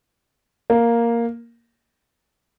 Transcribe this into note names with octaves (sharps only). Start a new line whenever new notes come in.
A#3